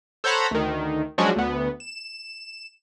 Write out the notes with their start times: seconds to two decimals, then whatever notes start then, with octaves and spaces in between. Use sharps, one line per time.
0.24 A4 C5 C#5 F#5 A#5 B5
0.51 D2 D#3
1.18 F3 F#3 G#3 C#4 D4 F#4
1.36 D2 B3
1.80 E7